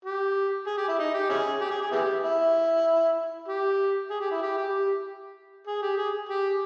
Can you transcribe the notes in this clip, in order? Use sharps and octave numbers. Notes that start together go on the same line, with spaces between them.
G4
G#4
G4
E4
D#4
G4
C#4 E4 G#4
G4
G#4
G#4
B3 E4 G4
E4
G4
G#4
G4
E4
G4
G4
G#4
G4
G#4
G4